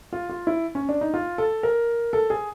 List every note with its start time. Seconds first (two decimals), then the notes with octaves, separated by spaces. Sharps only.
0.13 F4
0.29 F4
0.47 E4
0.75 C#4
0.89 D4
1.01 D#4
1.14 F4
1.38 A4
1.63 A#4
2.13 A4
2.30 G#4